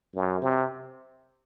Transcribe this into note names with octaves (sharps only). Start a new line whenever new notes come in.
F#2
C3